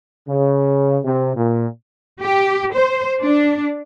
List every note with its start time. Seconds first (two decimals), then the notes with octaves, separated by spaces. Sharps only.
0.28 C#3
1.04 C3
1.36 A#2
2.21 G4
2.73 C5
3.21 D4